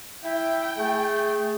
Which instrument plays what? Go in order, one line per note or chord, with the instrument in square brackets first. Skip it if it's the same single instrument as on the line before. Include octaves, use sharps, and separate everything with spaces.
[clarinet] E4 [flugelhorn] E5 [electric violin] G5
[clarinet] A3 [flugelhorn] G#4